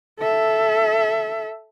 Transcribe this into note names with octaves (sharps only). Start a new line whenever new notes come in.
A4 E5